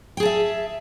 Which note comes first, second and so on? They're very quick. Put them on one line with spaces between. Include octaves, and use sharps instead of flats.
G5 G#4 A5 E5